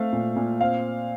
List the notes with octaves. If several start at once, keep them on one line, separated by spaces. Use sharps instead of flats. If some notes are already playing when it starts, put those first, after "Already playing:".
Already playing: A3 C4 F5
A#2
A#2
C4 F5